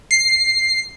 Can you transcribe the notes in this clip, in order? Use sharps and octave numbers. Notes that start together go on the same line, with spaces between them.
C7